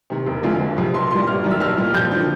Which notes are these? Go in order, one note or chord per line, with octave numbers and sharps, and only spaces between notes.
C3 D#3
E1
D2 D3 F3 G#3
F#1
F2 C3
B1 C6
A#2 G3 C6
G1 F6
F#2 D#3 G3
E6
B1 F6
A#2 G3
F2 G6
D3 F3